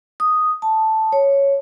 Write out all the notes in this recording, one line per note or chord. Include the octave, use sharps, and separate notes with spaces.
D#6
A5
C#5